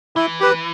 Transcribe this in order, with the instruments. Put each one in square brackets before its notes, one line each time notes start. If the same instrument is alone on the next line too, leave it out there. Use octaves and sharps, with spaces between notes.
[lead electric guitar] E3 [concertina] E4
[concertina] G4 B4